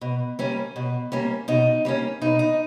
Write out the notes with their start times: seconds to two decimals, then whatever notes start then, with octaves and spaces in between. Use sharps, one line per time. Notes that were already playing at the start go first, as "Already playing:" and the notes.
0.01 B2
0.39 G3 A#3 C#4
0.76 B2
1.12 G3 A#3 C#4
1.48 B2 D#4
1.85 G3 A#3 C#4
2.21 B2 D#4
2.39 D#4